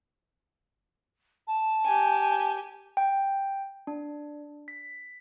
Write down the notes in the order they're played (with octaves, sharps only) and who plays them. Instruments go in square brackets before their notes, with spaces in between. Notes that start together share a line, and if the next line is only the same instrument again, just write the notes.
[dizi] A5
[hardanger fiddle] G4 G#5
[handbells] G5
D4
B6